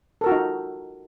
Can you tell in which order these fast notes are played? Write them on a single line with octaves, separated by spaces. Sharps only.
A4 A#4 F#4 F4 D#4